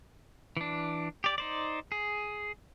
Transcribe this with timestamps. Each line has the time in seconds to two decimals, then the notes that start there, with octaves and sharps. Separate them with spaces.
0.57 E3 D4
1.24 G4 D5
1.38 D#4 C5 D5
1.92 G#4